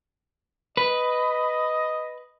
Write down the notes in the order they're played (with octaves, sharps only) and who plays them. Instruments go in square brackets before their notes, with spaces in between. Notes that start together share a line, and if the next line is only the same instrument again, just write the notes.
[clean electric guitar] B4 [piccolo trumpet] D#5